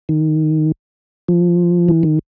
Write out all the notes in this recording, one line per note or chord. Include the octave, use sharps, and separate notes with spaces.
D#3
F3
E3
D#3